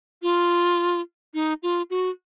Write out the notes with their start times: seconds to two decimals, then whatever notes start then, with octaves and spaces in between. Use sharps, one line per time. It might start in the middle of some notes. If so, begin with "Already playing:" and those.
0.23 F4
1.34 D#4
1.63 F4
1.90 F#4